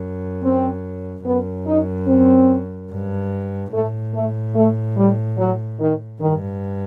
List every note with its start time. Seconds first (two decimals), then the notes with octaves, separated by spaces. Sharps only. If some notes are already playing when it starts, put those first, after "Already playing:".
Already playing: F#2
0.43 C4
1.25 F#2 B3
1.67 D#4
2.08 C4
2.91 G2
3.73 A2 A3
4.14 A3
4.55 A3
4.97 G3
5.38 F#3
5.80 D#3
6.21 G2 D#3